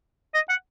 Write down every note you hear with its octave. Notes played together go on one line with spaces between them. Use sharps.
D#5
F#5